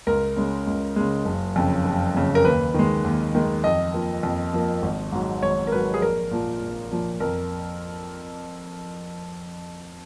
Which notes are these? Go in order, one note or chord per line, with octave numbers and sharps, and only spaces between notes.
C#2 A#4
C#3 G#3
C#2
C#3 G#3
F#1
F2 C#3
F#1
F2 C#3
A#4
D#2 B4
D#3 G#3
D#2
D#3 G#3
F2 D#5
F3 A#3
F2
F3 A#3
G#1
G#2 F#3
G#1 C#5
A#4
G#2 F#3 B4
G#4
A#1 A#4
A#2 F3
A#1
A#2 F3
F2 A#4